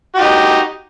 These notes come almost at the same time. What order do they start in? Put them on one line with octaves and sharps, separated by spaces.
G4 F#4 D#4